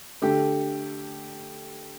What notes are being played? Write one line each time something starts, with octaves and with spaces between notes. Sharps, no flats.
D3 A3 G4